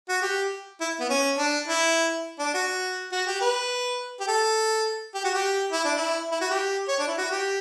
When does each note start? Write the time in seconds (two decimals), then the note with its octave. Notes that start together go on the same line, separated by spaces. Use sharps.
0.09 F#4
0.22 G4
0.81 E4
1.00 B3
1.09 C#4
1.38 D4
1.68 E4
2.39 D4
2.54 F#4
3.12 F#4
3.27 G4
3.41 B4
4.20 G4
4.28 A4
5.14 G4
5.24 F#4
5.35 G4
5.72 E4
5.85 D4
5.97 E4
6.31 E4
6.41 F#4
6.51 G4
6.89 C#5
6.99 D4
7.08 E4
7.18 F#4
7.32 G4